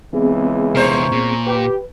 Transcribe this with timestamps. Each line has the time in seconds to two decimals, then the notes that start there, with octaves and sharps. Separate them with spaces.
0.13 C#2 E3 G#3 B3 C4 G#4
0.75 E2 C3 A#4 C5 C#5
1.12 A#2
1.46 G4 B4